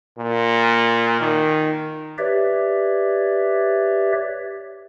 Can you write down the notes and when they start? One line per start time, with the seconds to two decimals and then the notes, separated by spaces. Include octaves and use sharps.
0.18 A#2
1.20 D#3
2.18 G4 B4 C#5 D5 E5